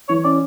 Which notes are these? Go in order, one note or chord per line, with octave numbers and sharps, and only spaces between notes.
E3 C#5
C#4 D5